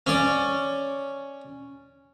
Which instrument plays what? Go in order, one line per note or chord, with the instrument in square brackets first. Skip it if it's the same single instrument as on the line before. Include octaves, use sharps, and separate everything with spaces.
[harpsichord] C#4 D5